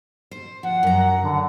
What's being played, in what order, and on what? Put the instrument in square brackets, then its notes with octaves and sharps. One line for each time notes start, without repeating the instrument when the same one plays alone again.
[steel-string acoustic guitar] C5
[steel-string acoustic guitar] F3 [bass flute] F#5
[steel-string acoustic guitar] F#2 A#5
[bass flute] D3